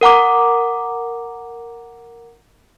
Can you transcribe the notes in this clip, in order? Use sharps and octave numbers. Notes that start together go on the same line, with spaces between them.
A#4 F#5 A#5 D6